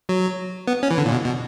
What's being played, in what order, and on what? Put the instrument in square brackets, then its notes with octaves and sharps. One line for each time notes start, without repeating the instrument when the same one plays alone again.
[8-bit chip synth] F#3
B3
C#4
E3
D3
A#2
B2
B2